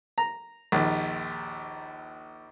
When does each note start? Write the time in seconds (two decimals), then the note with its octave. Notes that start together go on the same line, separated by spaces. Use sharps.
0.18 A#5
0.72 A#1 D#2